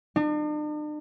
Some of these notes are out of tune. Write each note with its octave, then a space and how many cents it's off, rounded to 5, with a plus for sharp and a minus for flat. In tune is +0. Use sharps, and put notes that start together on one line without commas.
D4 +45